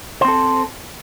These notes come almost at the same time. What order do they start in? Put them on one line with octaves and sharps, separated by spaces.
C5 C4 A4